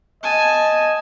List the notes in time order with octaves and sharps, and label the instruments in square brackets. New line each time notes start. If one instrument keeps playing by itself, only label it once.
[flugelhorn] D#5 [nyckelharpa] G#5 A5